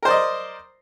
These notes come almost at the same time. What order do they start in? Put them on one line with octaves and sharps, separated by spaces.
A#4 C5 D5 D#5